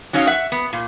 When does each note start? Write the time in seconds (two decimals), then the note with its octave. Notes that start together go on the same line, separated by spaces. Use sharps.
0.13 F#3 C#4 D#4 C#5 F5
0.27 E5 F#5
0.52 B3
0.73 A#2